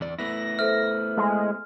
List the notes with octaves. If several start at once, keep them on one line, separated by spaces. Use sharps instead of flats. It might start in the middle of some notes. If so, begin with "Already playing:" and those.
E2 D5
A3 B3 E4 A#6
A4 C5 E5 F6
G#3